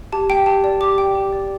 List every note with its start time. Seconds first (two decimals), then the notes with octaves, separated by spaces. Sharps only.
0.12 G4 A5
0.30 G5
0.46 G4 A5
0.64 D5
0.81 G4 D6
0.98 G5
1.15 G4
1.33 D5